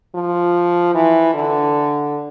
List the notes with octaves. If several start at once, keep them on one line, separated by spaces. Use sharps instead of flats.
F3
E3
D3